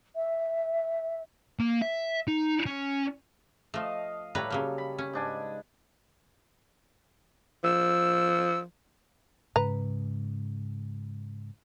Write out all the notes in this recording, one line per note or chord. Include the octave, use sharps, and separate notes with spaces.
E5
A#3
E5
D#4
C#4
F3 A3 D#5 F5
A2 G3 A4 B4 C#5 A#5
C#3 F#3 A#3
B5
C#4
G#2 D4 G#5
F3 E6
G#2 C#3 B4 A#5